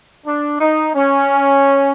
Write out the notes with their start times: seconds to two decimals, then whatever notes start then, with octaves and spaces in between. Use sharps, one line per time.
0.25 D4
0.59 D#4
0.93 C#4